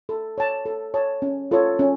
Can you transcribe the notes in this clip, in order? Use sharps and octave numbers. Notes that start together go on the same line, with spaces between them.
A4
C#5 A5
A4
C#5 A5
C#4
F4 A4 C#5
C#4